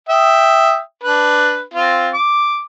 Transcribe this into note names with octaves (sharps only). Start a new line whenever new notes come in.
E5 G5 D#6
D4 B4
C4 F4
D6